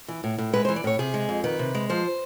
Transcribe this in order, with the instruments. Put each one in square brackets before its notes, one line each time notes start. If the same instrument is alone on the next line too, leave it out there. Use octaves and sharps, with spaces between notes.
[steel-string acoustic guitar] E3
A2
A2
G#3 B4
E3 C5
D5
A2 C#5
C3 G#4
G#3
F2
D#3 B4
C3
G#3
F3 C5